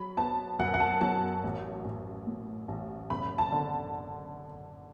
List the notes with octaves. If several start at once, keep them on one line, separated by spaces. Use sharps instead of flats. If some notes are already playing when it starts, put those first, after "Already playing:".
Already playing: F#3 B5
B3 A5
F#2 F#5
F#5
A5
F#3 A5
A1
A1
A2
A1
F#1 B5
A5
D3